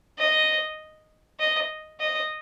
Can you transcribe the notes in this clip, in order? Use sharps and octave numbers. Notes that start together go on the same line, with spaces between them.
D#5
D#5
D#5